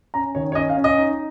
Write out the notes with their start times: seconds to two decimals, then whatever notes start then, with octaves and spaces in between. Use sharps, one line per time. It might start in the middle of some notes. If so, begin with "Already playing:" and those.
0.14 C#4 A#5
0.35 D#3 C#5
0.52 C#5
0.55 C#4 D#5
0.69 F5
0.77 C#4
0.84 D#5
0.98 D#4